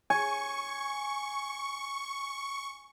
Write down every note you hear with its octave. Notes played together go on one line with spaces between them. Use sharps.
G#5 C#6